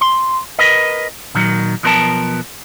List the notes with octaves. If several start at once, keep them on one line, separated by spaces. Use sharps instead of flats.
C6
A#4 B4 D#5
A#2 D#3 F#3
B1 F3 B3 A#4 C5 A5